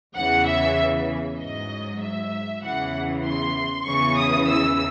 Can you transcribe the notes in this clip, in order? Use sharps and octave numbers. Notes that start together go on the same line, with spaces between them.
E2 C#3 E3 F#5
E5
G#2 F#3 D#5
E5
E2 C#3 E3 F#5
C6
E2 C#3 E3 C#6
D#6
E6